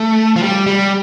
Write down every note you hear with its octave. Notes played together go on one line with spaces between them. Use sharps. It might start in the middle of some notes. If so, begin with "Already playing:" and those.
Already playing: A3
F3
G3
G3